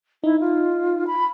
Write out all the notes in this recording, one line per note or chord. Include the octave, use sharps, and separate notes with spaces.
D#4 E4
F4
B5